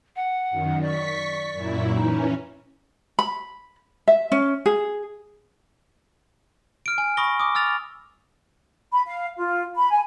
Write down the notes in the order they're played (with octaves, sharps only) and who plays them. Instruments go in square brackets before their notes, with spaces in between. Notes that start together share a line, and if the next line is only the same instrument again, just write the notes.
[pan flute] F#5
[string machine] F#2 D#3
[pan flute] D5 [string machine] C#6 B6
[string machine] F#2 A#2 E4
[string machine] E3 C#4 [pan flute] D#4
[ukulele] B5
E5
C#4
G#4
[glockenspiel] F6 D7
G#5
B5 C#6 D#6 A#6 G7
D6 D#6
E6 F6 A6 F7
[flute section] B5
F5
F4
B5
G#5